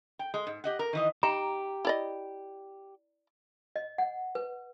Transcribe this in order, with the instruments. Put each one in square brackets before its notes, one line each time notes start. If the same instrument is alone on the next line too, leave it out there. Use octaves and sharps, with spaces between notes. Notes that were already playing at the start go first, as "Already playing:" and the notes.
[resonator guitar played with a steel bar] G5
G#3
G#2
G4 D#5 F#5
A#4
D#3 E3 D#5
[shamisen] D#4 [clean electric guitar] G4 [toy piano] A#5
[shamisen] E4 D5 D#5
[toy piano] D#5
F#5
B4